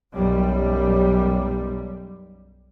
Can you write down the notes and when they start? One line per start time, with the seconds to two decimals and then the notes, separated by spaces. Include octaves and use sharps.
0.14 B1 F#2 G3